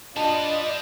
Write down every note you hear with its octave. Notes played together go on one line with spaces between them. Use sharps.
G3 D4 F4 B4 D5 D#5 A5